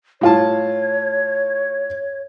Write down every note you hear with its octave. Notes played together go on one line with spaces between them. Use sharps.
A2 F4 C#5 A5